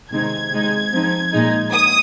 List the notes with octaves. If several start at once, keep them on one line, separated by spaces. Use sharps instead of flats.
C3 D#3 G#3 C4 D#4 G#6
C3 G#3 D#4
F3 C4 D#4
A#2 G#3 D#4
D#6